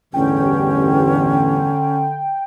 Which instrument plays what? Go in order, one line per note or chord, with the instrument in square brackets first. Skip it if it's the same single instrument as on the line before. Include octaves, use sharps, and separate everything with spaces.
[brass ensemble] A1 E2 G2 [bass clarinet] D3 [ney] C#4 [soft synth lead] G5